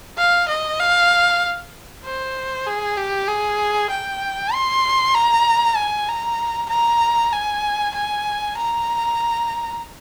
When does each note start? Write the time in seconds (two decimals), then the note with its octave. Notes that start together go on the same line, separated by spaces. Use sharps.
0.17 F5
0.48 D#5
0.80 F5
2.04 C5
2.66 G#4
2.97 G4
3.28 G#4
3.90 G5
4.53 C6
5.14 A#5
5.76 G#5
6.08 A#5
6.70 A#5
7.32 G#5
7.95 G#5
8.57 A#5